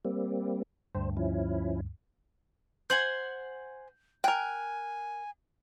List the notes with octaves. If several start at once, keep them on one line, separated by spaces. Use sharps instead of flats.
G3 A#3 C4
D2 G2 C5
F3 C#4 E4
C5 F#5 G#5 G6 F#7
A#4 G5 G#5 F#6